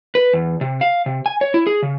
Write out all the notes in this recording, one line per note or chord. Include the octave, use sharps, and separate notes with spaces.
B4
E2
C3
F5
C3
G#5
C#5
E4
G#4
C#3